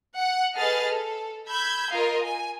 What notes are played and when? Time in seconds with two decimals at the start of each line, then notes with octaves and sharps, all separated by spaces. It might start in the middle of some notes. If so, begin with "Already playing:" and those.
0.16 F#5
0.56 G#4 A4 B4 D#5 F6 A6
0.88 A4
1.48 B5 E6 G6 G#6
1.92 F4 A#4 D#5 F5
2.24 G#5